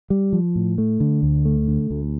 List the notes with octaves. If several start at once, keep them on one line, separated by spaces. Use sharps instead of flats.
G3
F3
A2
A3
D3
D2
A3
D3
D2